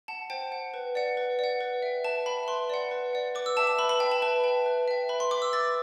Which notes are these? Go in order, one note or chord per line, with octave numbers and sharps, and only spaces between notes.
F#5 A5
C5 G5
F#5
B4
D5 F#5
B4
D5 F#5
B4
E5 G5
B4 A5
E5 G5 B5
B4 C6
D5 F#5
B4
D5 F#5
B4 D6
E6
E5 G5 A5
A5
B4 B5
B5
E5 G5
A5
B4 A5
E5 G5
B4
E5 G5
B4 B5
C6
E5 G5 D6
E6
B4 A6